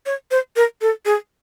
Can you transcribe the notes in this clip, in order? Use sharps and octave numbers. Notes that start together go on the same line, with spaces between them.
C#5
C5
A#4
A4
G#4